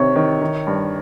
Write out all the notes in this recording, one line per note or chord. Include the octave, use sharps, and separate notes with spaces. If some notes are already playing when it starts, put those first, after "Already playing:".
Already playing: C3 D#3 C#5
D#3
D#3
G2